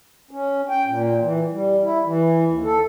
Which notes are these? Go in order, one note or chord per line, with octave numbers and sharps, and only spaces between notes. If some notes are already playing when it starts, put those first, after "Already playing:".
C#4
G5
A#2
E3
G3
E4
E3
D#2
A4